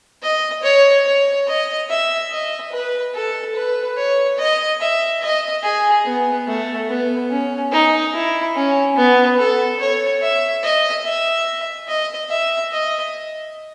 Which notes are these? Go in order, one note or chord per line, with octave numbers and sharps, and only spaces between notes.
D#5
C#5
C#5
D#5
E5
D#5
B4
A4
B4
C#5
D#5
E5
D#5
G#4
B3
A3
B3
C#4
D#4
E4
C#4
B3
A4
C#5
E5
D#5
E5
D#5
E5
D#5